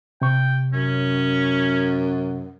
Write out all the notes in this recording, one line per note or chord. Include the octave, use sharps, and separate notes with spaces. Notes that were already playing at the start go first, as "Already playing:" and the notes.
C3 G5 C#6
F#2 C#4